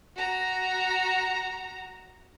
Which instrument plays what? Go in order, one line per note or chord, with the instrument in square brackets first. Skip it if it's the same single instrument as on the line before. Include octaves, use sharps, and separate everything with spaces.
[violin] F#4 A#5